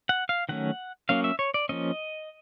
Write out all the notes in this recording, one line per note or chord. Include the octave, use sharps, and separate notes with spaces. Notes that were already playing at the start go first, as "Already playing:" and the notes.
F#5
F5
D#3 F#3 A3 C#4 F#5
F#3 A#3 C#4 F5
E5
C#5
D5
F3 A#3 C#4 D#5